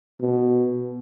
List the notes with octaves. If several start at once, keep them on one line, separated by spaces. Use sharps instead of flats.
B2